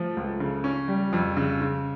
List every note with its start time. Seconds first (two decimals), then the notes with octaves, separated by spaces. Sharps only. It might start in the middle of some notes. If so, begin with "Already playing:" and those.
Already playing: F3 A3
0.17 C#2
0.40 C#3
0.64 C#4
0.88 G3
1.13 F2
1.37 C#3
1.61 C#3